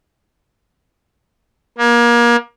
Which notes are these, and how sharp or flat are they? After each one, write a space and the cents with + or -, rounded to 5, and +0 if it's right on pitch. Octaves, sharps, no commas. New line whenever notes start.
A#3 +30